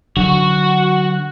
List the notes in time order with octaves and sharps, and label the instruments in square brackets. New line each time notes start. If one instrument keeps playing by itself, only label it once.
[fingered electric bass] D3 F#3 [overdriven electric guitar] F#4